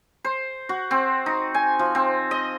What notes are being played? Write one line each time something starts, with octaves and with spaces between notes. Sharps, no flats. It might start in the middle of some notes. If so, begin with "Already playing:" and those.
C5
F#4
C4
D#4
G#5
F3
C4
D#5